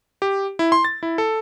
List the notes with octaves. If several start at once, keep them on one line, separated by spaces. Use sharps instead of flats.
G4
E4
C6
A6
E4
A4